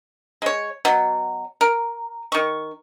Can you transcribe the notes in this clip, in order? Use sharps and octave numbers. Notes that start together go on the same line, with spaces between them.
G#3 C#5
B2 F#3
A#4
D#3 C#6